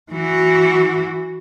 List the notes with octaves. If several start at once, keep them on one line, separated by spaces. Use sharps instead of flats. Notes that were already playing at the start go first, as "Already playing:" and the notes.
E3 F#4